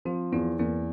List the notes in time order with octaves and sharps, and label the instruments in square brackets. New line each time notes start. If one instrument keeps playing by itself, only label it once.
[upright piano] F3 [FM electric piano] C4
[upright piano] E2 [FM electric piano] B3
[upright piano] E2 [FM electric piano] A#3